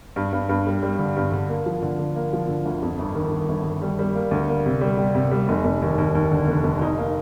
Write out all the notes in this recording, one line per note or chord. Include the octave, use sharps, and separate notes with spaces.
G2
G2
G2
G3
G3
D3
G2
D3
A#3
F3
D3
D3
A#3
F3
D3
D2
F2
G1
D#3
D#3
G1
G1
G3
G3
A#3
D2
A#3
C3
G3
G3
C3
G3
F1
F1
D#2
D#2
D#2
D3
F1
F1
D#4
A#3